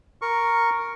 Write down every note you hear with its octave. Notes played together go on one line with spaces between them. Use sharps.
A#4 C#6